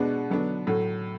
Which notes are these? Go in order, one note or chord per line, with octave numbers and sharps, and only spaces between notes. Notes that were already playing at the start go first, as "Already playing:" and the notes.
Already playing: B2 G#3 B3 D4
D3 F#3 B3 D4
A2 F#3 A3